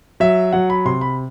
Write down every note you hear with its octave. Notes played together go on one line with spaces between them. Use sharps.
F#3 E5
F#3 F#5
B5
C3 C6
B5